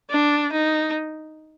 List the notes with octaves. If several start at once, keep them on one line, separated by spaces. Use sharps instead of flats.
D4
D#4